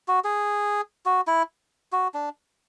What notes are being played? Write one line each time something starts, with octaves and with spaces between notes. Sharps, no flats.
F#4
G#4
F#4
E4
F#4
D4